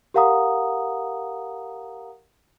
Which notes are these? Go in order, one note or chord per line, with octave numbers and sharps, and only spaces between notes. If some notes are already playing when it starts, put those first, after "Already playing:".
G4 A#4 F5 F#5 A#5 D#6